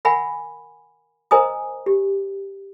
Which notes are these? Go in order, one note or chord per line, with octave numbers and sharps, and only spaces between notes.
A#4 E5 F#5 G#5 B5
A#4 C5 D#5 G#5 A#5 D#6
G4